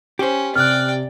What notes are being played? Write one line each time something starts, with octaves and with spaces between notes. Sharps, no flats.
C#4 G4 C5
C3 D5 G5 F6 F#6